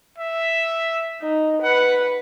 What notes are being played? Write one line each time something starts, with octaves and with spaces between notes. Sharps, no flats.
E5
D#4
B4 F#5